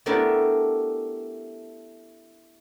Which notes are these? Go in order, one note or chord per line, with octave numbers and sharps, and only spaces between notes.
A3 B3 D4 E4 G4 A#4